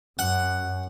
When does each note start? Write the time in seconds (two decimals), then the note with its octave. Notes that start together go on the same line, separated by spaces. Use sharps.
0.19 F#2 F#5